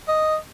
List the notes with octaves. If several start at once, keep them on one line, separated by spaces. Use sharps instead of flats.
D#5